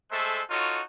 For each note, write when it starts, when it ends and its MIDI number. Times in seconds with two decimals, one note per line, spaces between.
0.11 0.42 56
0.11 0.42 57
0.11 0.42 69
0.11 0.42 72
0.11 0.42 76
0.50 0.81 63
0.50 0.81 65
0.50 0.81 66
0.50 0.81 69
0.50 0.81 73